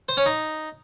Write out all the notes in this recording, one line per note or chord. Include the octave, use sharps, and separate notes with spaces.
C5
C#4
D#4